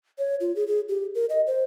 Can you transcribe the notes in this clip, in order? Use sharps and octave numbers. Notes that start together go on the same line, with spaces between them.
C#5
F4
G#4
G#4
G4
A#4
D#5
C5